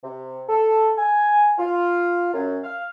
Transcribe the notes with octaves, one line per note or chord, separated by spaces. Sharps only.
C3
A4
G#5
F4
F#2
F5